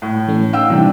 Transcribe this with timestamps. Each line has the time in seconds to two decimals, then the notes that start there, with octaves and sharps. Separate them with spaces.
0.02 A2
0.28 E3 A3 C#4
0.53 D#4 F5 G5 E6
0.70 C3 E3 G3 D4